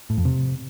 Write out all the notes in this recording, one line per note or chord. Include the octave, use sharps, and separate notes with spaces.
A2
F2
C3